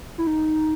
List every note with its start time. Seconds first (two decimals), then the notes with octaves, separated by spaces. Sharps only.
0.18 E4
0.27 D#4